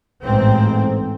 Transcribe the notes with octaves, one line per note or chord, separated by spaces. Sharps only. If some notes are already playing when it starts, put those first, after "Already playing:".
A1 G#2 C4